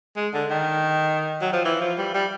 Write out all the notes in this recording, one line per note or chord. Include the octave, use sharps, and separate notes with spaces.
G#3
D3
D#3
F#3
F3
E3
F3
G3
G3